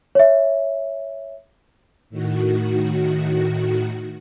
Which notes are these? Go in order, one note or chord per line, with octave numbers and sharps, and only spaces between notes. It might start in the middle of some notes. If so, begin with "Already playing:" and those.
C#5 E5
A2 D#3 F#4